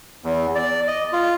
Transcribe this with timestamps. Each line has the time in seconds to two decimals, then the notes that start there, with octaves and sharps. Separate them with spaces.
0.24 E2
0.55 D5
0.88 D#5
1.13 F4